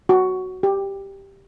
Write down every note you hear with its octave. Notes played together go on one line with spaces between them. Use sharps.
F#4
G4